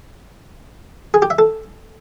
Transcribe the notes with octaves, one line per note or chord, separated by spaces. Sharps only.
G#4
G4
E5
A4